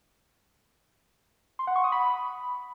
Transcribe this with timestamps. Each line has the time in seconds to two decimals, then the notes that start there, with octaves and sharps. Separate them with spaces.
1.59 C6
1.67 F#5
1.76 C#6
1.84 D#6
1.92 B5